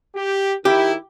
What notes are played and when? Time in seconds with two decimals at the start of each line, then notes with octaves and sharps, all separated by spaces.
0.15 G4
0.65 D#3 E4 G4